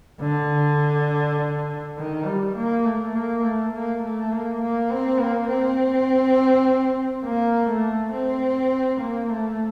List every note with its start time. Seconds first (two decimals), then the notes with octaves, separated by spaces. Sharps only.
0.21 D3
1.97 D#3
2.26 G3
2.56 A#3
2.85 A3
3.14 A#3
3.43 A3
3.73 A#3
4.02 A3
4.32 A#3
4.61 A#3
4.90 C4
5.20 A#3
5.49 C4
7.25 A#3
7.69 A3
8.13 C4
9.00 A#3
9.29 A3